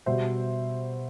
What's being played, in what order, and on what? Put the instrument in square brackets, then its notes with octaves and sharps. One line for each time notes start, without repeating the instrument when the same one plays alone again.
[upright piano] B2 G3 C5 E5